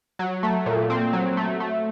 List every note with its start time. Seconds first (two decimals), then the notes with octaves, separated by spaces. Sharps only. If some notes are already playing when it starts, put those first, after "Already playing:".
0.19 F#3
0.43 A3
0.66 A#2
0.90 C4
1.13 F#3
1.37 A3
1.60 A3